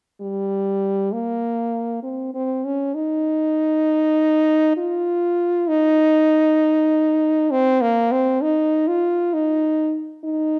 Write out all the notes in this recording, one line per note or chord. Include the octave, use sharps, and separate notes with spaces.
G3
A#3
C4
C4
C#4
D#4
F4
D#4
C4
A#3
C4
D#4
F4
D#4
D#4